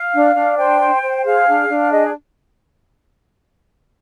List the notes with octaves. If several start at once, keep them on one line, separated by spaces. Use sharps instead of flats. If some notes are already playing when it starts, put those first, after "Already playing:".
Already playing: F5
D4
D4
C5 G5
C5
C5
G#4 F5
D4
D4
G#4 D#5